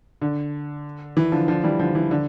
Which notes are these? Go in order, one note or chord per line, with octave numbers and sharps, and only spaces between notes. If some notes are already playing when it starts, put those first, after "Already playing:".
D3
E3
D3 F3
D3 F3
E3 G3
D3 F3
E3
D3